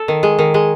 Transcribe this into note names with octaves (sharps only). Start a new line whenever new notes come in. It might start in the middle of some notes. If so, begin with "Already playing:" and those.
Already playing: A4
D#3
G#3
D#3
G#3